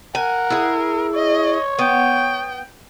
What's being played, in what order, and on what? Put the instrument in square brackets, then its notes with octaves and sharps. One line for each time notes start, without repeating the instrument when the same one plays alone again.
[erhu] A#4 [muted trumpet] F#5 [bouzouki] G#5
[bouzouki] E4 G#4
[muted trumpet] C#5 [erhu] D#5
[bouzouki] B3 [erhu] G5